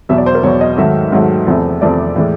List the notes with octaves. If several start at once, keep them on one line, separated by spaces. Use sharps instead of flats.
E2 B2 F#3 E5
D5
C5
A#4
E2 B2 F#3 C#5
D#5
G#2 D#3 F#3 A3 E5
G#2 D#3 F#3 A3
E2 C3 F3 A3
E2 C3 F3 A3 D5
A2 E3 G#3